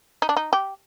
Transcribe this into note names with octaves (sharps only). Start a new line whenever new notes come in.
D#4
D4
D#4
G4